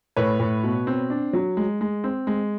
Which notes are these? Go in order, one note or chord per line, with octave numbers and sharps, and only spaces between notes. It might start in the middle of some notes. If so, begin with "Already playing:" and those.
A2 B4 C#5
A2
B2
C4
D4
F#3
G#3
G#3
C4
G#3